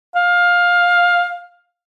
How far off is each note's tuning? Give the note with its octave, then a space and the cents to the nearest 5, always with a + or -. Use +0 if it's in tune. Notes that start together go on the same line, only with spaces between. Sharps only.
F5 +15